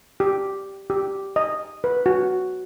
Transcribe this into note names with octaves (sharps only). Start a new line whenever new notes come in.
G4
G4
D#5
B4
F#4